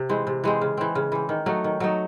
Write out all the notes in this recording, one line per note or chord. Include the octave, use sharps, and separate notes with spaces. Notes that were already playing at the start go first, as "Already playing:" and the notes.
Already playing: C3
E3 G#3 C4
C3
E3 G#3 C4
C#3
E3 C4
C#3
E3 C4
D#3
F#3 A3 D#4
D#3
F#3 A3 D#4